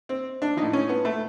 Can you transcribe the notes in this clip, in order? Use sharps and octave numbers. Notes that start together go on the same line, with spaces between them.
C4
D4
A2 F3 D#4
C#4
B3
A3